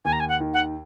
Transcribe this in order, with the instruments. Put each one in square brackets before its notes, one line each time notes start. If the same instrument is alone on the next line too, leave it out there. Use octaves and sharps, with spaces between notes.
[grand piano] D#2 [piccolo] G#5
[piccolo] A#5
G#5
F#5
[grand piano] D#3
[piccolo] F#5